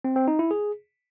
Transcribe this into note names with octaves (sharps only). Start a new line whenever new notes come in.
C4
C4
D#4
E4
G#4